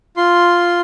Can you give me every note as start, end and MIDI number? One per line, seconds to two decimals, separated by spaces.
0.17 0.81 65
0.17 0.81 84